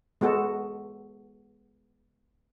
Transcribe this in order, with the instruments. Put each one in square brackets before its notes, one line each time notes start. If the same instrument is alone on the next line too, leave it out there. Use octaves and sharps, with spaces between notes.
[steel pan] G#3 B3 F#4 A4